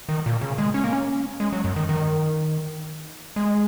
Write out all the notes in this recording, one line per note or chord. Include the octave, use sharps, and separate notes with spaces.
D#3
A#2
C#3
G#3
C#4
A#3
C#4
G#3
F#3
F#2
D#3
D#3
G#3